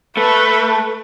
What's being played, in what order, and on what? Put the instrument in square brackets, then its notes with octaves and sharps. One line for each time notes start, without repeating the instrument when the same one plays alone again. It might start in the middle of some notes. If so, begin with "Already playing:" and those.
[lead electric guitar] A3 [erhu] B4